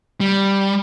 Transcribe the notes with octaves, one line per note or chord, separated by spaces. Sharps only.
G3